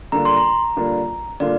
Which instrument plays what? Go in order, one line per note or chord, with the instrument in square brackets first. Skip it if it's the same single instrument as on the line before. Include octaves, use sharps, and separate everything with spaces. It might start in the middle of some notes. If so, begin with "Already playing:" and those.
[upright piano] D3 G3 A#3 D4 F4 [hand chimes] A#5
[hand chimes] C6
A#5
[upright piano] D3 G3 A#3 D4 F4
[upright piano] D3 G3 A#3 D4 F4 [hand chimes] D5